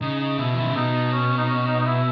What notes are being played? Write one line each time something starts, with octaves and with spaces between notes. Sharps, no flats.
C#3 D#4
D#4
B2 E4
E3
D#3 E4
C#3
B2 D#4
C#4
D#4
C#4
D#4
D#4
E4